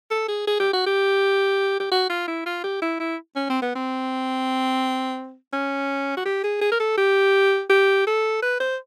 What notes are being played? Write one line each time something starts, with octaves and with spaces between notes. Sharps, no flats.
A4
G#4
G#4
G4
F#4
G4
G4
F#4
F4
E4
F4
G4
E4
E4
C#4
C4
B3
C4
C#4
F#4
G4
G#4
G#4
A#4
A4
G4
G4
A4
B4
C5